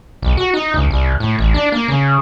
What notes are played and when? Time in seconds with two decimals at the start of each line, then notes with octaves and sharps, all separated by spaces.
0.22 B1
0.37 F#4
0.54 D#4
0.74 C#2
0.91 C2
1.20 A2
1.39 A1
1.54 D4
1.72 A#3
1.88 C#3